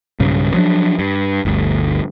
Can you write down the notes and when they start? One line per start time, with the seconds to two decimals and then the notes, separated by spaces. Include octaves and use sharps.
0.20 B1 G2 C#3
0.54 F3 F#3 C4 D4
0.99 G2
1.45 G1 D2